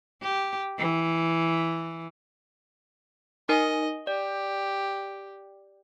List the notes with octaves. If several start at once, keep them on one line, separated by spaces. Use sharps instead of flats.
G4
E3
D#4 A#4 D#5 G#5
G4 D5